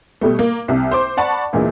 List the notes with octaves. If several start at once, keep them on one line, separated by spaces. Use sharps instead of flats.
B2 G3 A3
A#3
C2 C3
C5 C6 D6
D5 F#5 A5 B5 C#6
D2 A#2 E3 G#3